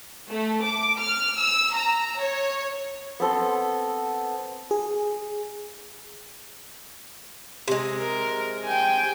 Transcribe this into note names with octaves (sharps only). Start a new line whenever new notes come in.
A3
D6
F6
E6
A#5
C#5
B3 C4 A4 C6
G#4
C3 G#3
A#4
G5 G#5